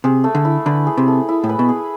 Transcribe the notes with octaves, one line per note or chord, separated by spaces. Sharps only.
C3 G#4
A3
D3
E4
D3 B4
G#4
C3
A3
E4
A2
B4
B2
G#4